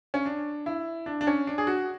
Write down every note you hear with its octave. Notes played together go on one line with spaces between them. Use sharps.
C#4
D4
E4
D4
D4
C#4
D4
G#4
F#4